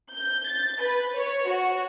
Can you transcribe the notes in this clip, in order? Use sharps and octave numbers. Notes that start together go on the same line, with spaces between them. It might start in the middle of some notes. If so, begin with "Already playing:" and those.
G6
A6
B4
C#5
F#4